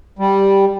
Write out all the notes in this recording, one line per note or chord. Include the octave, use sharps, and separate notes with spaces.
G3